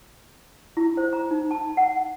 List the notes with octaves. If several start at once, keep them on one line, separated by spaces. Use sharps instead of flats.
E4
C5
A#5
D#4
A5
F#5